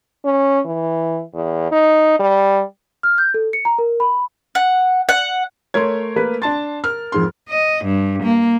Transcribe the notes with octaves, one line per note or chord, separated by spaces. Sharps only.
C#4
E3
E2
D#4
G3
F6
G6
A4
C#7
A#5
A#4
B5
F#5
F#5
A3 A#4 C#5 C6 G#6
A#3 B4
D4 A5 C6 A6
A#4 F6
F2 G#2 C6
D#5
G2
A#3